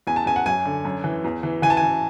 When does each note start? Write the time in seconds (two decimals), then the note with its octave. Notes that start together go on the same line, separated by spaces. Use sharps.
0.07 E2 G#5
0.16 A5
0.26 E2 G#5
0.36 F#5
0.46 F#2 G#5
0.65 D3
0.85 F#2
1.04 E3
1.24 E2
1.43 E3
1.62 E3 G#5
1.70 A5
1.77 G#5
1.82 E3